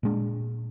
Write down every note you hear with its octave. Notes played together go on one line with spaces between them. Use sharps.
A#2 G#3 D4